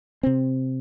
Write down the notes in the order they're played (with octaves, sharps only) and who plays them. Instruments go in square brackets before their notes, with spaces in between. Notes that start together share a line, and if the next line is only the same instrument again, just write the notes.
[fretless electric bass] C3 C4